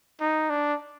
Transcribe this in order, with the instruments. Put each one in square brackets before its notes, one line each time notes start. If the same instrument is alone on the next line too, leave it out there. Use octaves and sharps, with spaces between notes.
[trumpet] D#4
D4